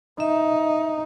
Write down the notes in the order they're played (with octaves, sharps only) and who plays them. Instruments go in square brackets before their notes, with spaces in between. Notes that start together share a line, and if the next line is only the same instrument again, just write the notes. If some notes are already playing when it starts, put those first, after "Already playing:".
[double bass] D#4 [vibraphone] E5